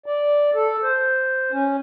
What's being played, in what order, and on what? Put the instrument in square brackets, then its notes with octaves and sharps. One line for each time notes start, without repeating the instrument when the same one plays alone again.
[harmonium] D5
A4
C5
C#4